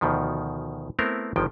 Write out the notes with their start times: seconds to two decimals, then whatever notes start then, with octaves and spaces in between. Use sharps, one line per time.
0.01 D2 B2 D#3 F3
0.99 A3 B3 C4 E4 A#4
1.36 G1 D#3 F3 G#3 G5